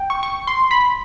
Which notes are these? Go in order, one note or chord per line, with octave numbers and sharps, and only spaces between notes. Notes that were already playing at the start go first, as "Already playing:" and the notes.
Already playing: G5
C#6
C#6
C6
B5